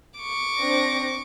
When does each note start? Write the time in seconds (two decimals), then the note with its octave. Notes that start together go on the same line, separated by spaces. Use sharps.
0.20 C#6 D6
0.60 C4 D4 A#6